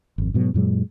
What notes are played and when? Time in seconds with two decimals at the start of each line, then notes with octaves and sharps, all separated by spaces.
0.18 G#1 F2
0.34 G#2 B2 F3 F#3
0.54 F#2 A#2 F#3 G#3